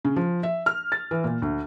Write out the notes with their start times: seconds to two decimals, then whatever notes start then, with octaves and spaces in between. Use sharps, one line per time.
0.05 C#3
0.16 F3
0.43 E5
0.66 F6
0.92 A6
1.11 E3
1.24 A#2
1.42 D2